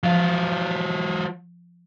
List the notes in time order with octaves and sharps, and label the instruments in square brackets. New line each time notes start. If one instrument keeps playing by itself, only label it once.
[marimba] F3 [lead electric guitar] F#3 F4